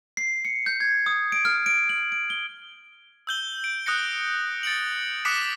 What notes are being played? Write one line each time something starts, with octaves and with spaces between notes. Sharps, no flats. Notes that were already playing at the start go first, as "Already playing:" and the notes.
C7
C#7
G6
G#6
D#6
D7
F6
D7
F#7
D7
G7
E6 G6 G7
D7
D#6 F#6 G6 A#6 C#7
A6 C#7 D7 F#7
D6 D#6 F#6 B6 C#7 E7